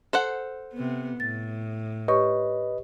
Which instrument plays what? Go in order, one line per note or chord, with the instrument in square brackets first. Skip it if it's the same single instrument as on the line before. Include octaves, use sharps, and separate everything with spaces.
[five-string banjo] A4 C5 F#5
[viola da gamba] C3 B3
[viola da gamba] A2 [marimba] A6
[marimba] G4 C#5 C#6 [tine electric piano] B4 D#5